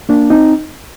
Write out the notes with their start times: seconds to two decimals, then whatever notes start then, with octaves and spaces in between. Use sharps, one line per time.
0.09 A#3 D4
0.30 C4 D#4